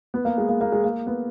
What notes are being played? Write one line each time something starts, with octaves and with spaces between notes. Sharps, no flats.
B3
A#3
G#3
A#3
A#3
G#3
A#3
B3